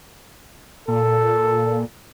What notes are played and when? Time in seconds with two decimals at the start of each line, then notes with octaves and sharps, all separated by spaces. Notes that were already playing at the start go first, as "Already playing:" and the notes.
0.88 A#2 A4